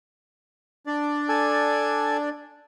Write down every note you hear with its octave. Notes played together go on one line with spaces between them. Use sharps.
D4 D5
A4 G#5